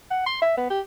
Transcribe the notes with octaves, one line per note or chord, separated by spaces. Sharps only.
F#5
C6
E5
B3
G4